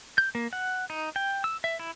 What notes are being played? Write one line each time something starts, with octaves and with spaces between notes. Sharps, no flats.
G6
A#3
F#5
D#4
G5
E6
E5
E4